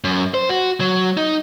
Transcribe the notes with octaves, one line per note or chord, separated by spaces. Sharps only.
F#2
C5
F#4
F#3
D#4